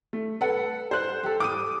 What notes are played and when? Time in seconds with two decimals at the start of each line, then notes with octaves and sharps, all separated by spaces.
0.13 A3
0.41 A4 B4 F#5
0.91 C5 F#6
1.23 G4 A4
1.40 D6 D#6 D#7